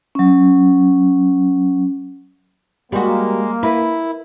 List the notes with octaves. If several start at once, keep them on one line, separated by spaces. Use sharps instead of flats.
F#3 C#4
G3 G#3 A#3 F#4
E4 A#4 B4